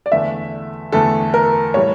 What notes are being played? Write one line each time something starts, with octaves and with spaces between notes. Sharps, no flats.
D5
E2 D3 A3 E5
E2 D3 A3 A4
A#4
A2 E3 G3 C#5